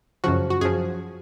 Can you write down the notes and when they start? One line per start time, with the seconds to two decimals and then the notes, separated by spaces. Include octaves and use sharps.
0.24 F#2 C#3 F3 F#4
0.50 F#4
0.61 F#2 F3 G#4